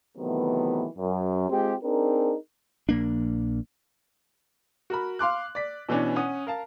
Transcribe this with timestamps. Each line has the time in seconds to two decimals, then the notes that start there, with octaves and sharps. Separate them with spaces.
0.18 C3 D#3 E3 F#3 A3 B3
0.97 F#2
1.50 G#3 C4 F4 G4
1.84 C4 D4 D#4 G#4 A#4
2.89 A#1 A#3 D4
4.90 F#4 A#4 B5
5.19 F5 C6 D6 F#6
5.55 D5 B6
5.89 B2 E3 B3 C#4 D4
6.16 C#4 F#5 D#6
6.47 A#4 F5 A5